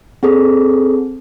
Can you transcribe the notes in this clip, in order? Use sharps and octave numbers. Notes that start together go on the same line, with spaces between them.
C4 G#4 A4